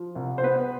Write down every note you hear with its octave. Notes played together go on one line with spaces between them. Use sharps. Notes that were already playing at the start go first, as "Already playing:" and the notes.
Already playing: F3
C2
C5
B3 B4